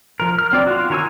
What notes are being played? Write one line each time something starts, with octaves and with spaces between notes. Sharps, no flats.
F3 A#4
F6
F#3 C4 D5
F4 F#4
D#3 A#4 C#5 G#5 E6